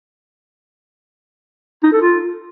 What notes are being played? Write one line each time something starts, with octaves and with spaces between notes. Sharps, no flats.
D#4
A4
F4